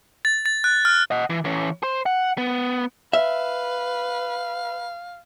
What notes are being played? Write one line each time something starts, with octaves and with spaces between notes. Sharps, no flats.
A6
A6
F#6
F6
D#5 F#5
E3
E3 C#4
C5
F#5
B3
B4 E5 F5